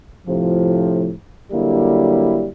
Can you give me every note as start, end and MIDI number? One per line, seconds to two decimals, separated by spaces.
0.27 1.11 45
0.27 1.11 48
0.27 1.11 53
1.51 2.48 50
1.51 2.48 54
1.51 2.48 55
1.51 2.48 58
1.51 2.48 64